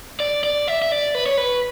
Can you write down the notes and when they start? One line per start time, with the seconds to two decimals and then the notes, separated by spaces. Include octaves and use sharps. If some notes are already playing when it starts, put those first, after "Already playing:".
0.20 D5
0.44 D5
0.68 E5
0.82 E5
0.92 D5
1.15 B4
1.26 C#5
1.37 B4